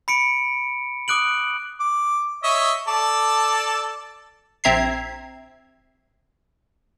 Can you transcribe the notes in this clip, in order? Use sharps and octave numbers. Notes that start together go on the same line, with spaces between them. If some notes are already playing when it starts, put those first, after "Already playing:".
B5 C#7 D7
D6 D#6 F#6 D7 F#7
D6
C#5 D#5 E5
A4 D5 A5
A#1 C4 E5 A#5 G#6 C7